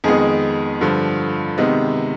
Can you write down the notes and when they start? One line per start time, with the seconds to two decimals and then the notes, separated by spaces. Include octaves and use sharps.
0.04 F2 D#3 G#3 B3 G#4
0.81 G2 D3 F3
1.58 C3 D#3 G#3 B3